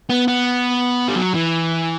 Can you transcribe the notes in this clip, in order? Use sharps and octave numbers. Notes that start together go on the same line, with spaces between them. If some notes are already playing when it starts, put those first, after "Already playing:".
B3
B3
G3
F#3
E3